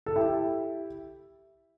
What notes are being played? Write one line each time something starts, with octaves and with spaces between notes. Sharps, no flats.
A4
E4 G4